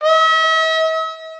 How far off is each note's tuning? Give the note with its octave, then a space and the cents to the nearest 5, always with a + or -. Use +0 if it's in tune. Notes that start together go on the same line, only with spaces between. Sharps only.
E5 -45